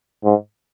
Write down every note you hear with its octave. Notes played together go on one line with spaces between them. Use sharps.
G#2